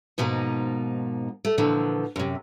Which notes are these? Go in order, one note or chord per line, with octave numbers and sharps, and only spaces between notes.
G#2 B2 F3 A#3 D#4
A3
A#2 D3 E3 F3
F#2 C3